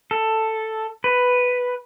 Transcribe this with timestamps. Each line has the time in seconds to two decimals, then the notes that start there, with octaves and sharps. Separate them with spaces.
0.11 A4
1.04 B4